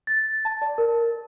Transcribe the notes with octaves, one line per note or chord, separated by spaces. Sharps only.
A6
A5
D5
A#4